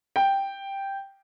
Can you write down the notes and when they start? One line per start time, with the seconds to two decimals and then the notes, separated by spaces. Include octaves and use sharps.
0.16 G5